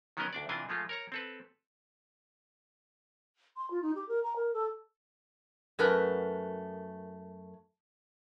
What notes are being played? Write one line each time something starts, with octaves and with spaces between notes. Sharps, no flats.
D#3 F#3 B3 C#4 A#4 D#5
D2 D4 D5
C3 E3 D4 F4 D#5 G#5
F3 G#3 A3 F4
A#4 C#5 A#5
C4 A4 B4
C6
F4
D#4
G4
A#4
A#5
A#4
A4
F#2 A3 A#4 B4